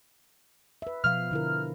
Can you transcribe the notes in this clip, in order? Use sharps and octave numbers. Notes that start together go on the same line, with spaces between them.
B4 E5
B2 F3 F5 F6
D3 E4 A#4